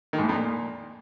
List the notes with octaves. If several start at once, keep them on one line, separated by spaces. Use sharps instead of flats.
D#3
G#2
A2
F2
A#2